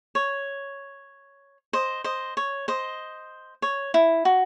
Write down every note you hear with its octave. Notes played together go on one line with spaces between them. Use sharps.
C#5
C5 D#5
C5 D#5
C#5
C5 D#5
C#5
E4
F#4